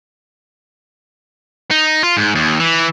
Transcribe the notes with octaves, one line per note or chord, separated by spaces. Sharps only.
D#4
F4
G#2
D#2
E3